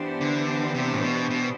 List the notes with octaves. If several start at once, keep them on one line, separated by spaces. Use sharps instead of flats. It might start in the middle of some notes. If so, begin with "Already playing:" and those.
Already playing: E3 B3 D4 G4 C5
D3
C3
A2
B2
B2